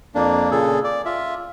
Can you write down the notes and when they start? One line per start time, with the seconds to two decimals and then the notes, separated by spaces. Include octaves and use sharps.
0.15 F2 A#3 D4
0.51 A#2 C#3 G#4 A4
0.84 D5
1.05 F4 E5